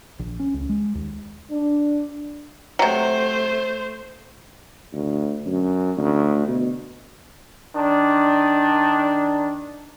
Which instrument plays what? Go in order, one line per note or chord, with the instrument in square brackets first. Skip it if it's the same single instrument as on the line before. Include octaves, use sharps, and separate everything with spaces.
[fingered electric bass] A#1
C#4
C#2
G#3
D#2
[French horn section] D4
[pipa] C3 F#3 [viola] A3 C5
[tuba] D2
F#2
D2
B2
[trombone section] D#3 D4